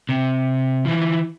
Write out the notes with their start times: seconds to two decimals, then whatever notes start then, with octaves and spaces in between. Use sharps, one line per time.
0.09 C3
0.85 E3 F3